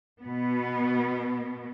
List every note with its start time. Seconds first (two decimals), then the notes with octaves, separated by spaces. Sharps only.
0.23 B2 B3